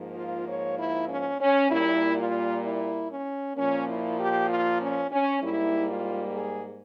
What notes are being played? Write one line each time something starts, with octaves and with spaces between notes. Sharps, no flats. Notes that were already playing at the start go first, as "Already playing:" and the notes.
Already playing: G#2 F3 A#3
F4
C#5
E4
C#4
C#4
A#2 G3 A#3 E4
F4
E4
C#4
A#2 F3 A#3 C#4
E4
G4
F4
C#4
C#4
G#2 G3 A#3 E4
F4
G#4